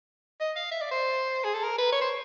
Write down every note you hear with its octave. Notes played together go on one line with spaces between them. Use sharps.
D#5
F5
E5
D5
C5
G#4
A4
A#4
B4
C#5
C5